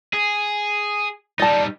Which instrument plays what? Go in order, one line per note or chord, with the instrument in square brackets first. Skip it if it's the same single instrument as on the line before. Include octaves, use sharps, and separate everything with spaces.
[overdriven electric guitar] G#4
[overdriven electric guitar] G3 D#4 [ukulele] D5 A5